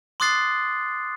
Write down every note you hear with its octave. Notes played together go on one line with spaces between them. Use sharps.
C6 D6 D#6 F#6 A6 C7